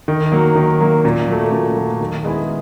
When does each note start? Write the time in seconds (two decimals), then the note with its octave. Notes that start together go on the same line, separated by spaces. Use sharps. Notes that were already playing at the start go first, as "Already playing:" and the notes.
0.08 D#3
0.32 F#3 A#3
0.55 D#3
0.81 F#3 A#3
1.05 A#2
1.28 F#3 A3
1.52 A#2
1.76 F#3 A3
2.00 D#3
2.24 G#3 B3 E4 G#4